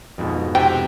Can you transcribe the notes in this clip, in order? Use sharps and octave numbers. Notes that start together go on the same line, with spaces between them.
F2 G#2 B2
C3 G5